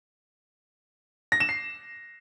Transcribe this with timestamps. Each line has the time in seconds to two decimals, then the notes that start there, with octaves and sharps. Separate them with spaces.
1.32 A#6
1.40 E7
1.49 C7